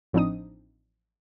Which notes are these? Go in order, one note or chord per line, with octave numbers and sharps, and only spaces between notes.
A1 F3 C4 D4 D#4 D#6